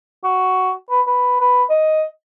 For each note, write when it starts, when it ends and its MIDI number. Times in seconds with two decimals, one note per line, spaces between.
0.24 0.72 66
0.90 1.01 71
1.07 1.39 71
1.41 1.63 71
1.70 2.04 75